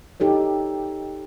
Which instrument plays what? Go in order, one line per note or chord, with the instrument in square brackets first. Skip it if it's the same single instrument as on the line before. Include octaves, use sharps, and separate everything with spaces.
[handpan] D#4 G4 A4 C#5